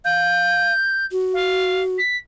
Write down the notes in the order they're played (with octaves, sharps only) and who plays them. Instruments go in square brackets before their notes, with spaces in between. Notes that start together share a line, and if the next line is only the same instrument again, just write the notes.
[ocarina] F5 [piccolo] G6
[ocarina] F#4
[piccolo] F5
B6